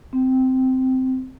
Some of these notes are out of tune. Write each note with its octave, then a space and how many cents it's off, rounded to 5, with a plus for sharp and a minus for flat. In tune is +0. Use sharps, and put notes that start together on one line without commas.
C4 -10